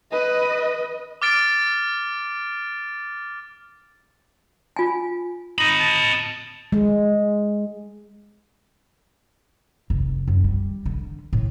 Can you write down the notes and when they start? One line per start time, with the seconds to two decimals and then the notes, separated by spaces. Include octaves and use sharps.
0.11 B4 D#5
1.22 D6 F6 A6 D7
4.76 F4 G#5
5.58 D#4 D#5 B5
5.80 A5
6.72 G#3
9.90 F1
10.28 F#2
10.44 G3
10.86 D3
11.33 A2